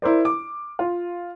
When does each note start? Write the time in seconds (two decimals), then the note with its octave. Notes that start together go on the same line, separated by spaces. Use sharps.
0.02 E4 A#4 C5 D5
0.25 D6
0.79 F4